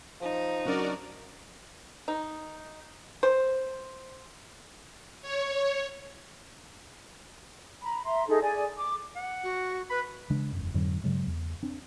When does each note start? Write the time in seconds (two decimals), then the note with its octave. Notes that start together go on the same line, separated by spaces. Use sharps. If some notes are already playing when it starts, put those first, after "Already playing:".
0.21 F3 D#4
0.66 F#3 C#4 D4 F#4 A#4 D5
2.08 D#4
3.23 C5
5.22 C#5
7.82 A#5 B5
8.04 E5 A#5 C6
8.28 D#4 G#4 A4
8.42 G#4 D5 G#5
8.76 D6
9.16 F#5
9.43 F#4
9.90 B4 B5
10.30 C#3 E3 G#3 D4
10.53 E1 F#2
10.74 F2 G#2 D3 F#3
11.04 G2 C#3 F#3 G#3
11.27 E2
11.63 C4 D4